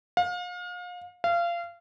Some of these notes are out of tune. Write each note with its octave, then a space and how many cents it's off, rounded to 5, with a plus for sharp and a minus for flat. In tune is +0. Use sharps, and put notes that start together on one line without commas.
F5 +35
F5 -25